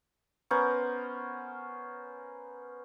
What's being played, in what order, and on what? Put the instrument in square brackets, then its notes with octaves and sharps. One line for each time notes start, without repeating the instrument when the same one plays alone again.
[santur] B3 C#4 A#4 C5